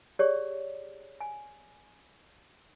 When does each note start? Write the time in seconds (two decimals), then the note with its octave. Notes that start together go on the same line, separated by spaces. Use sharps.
0.19 G4 G#4 C#5 D5
1.21 G#5